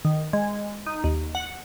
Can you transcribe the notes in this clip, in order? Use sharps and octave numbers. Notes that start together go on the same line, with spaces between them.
D#3
G#3
D#4
D#2
F#5